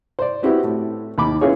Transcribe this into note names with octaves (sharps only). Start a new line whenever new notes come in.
C5 D5
B3 C4 E4 F#4 G4
A2
D#2 B5 D6
B3 C#4 E4 F4 G#4 C#5